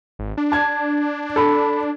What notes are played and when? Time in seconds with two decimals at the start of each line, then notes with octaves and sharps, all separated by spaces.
0.19 G#1
0.37 D4
0.52 A5 G#6
1.36 A4 B5